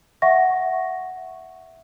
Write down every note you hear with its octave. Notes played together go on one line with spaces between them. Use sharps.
E5 F#5 C#6 A#6